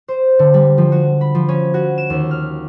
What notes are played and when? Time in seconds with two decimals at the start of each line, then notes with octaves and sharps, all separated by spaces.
0.08 C5
0.39 D3
0.54 G3
0.78 F3
0.92 F#4
1.21 B5
1.35 F3
1.48 C#4
1.74 F#4
1.98 E7
2.10 D#2
2.31 F6